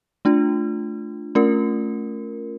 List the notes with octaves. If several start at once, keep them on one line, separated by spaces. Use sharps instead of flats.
A3 D4 F4
A3 C#4 F4 A#4